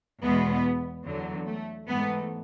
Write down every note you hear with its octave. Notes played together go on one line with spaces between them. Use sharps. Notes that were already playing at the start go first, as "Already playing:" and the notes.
E2 B2 G#3 B3
E2 D3 F#3
A3
G#2 E3 A3 B3